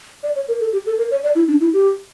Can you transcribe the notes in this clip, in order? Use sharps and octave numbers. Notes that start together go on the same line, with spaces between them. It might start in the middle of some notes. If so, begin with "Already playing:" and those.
D5
C#5
A#4
A4
G4
A4
A#4
C#5
D5
E4
D4
E4
G4